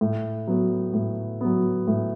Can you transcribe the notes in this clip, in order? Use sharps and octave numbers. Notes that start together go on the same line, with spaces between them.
A2
F#3 B3
A2
F#3 B3
A2